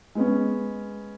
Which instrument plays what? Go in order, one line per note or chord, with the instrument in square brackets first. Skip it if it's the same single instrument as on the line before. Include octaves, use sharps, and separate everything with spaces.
[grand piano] G#3 B3 C#4